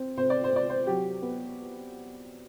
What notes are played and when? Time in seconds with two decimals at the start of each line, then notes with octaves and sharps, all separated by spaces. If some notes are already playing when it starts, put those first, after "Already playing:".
Already playing: C4
0.17 C3 C5
0.30 D5
0.44 C5
0.53 C3 D5
0.70 C5
0.87 F#3 G4
1.22 B3